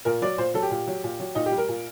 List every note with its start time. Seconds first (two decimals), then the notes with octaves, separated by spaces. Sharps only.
0.05 A#2 A#4
0.22 F#3 D5
0.38 A#2 C5
0.54 F#3 A4
0.62 G4
0.71 A#2
0.87 F#3
1.04 A#2
1.20 F#3
1.35 A#2 D#4
1.46 G4
1.52 G3
1.58 A#4
1.68 A#2